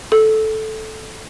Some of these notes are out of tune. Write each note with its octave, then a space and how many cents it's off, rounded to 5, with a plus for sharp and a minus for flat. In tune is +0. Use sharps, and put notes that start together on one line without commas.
A4 -10